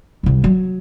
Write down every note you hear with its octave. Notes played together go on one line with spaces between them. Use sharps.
G1 C2
F#3